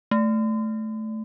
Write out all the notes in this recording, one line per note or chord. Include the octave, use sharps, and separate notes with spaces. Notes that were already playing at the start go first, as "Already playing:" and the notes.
A3